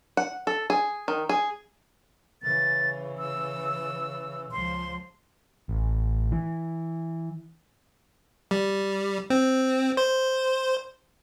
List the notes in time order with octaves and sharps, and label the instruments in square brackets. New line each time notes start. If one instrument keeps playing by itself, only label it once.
[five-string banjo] F#5
A4
G#4
D#3
G#4
[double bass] C#3 E3 [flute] A6
[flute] E6
[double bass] C#2 F3 [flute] C6
[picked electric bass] A1
E3
[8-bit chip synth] G3
C4
C5